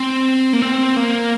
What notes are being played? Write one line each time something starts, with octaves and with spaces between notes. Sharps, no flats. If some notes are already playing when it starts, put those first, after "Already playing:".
Already playing: C4
A#3
C4
A#3